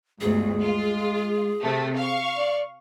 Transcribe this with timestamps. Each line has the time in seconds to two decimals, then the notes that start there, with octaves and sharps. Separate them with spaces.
0.20 G1 D2 G#3 G#4
0.64 F4
1.61 C3 A3
1.97 F5 C#6
2.38 D5